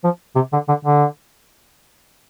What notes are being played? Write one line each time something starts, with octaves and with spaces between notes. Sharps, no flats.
F3
C3
D3
D3
D3